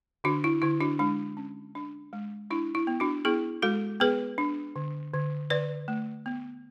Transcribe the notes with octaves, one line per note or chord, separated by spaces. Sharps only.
D3 D4 F#4
E4
D3 E4
D4 F#4
G#3 D4
C#4
D4
G#3
D4 E4
E4
B3
D4 F#4
B3 E4 G#4
G#3 F#4 A4
B3 G#4 B4
D4
D3
D3
D3 B4 D5
A3
B3